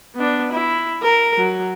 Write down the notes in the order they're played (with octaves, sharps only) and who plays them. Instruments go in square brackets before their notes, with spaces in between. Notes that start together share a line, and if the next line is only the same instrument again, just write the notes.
[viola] B3 D4
E4
A#4
F#3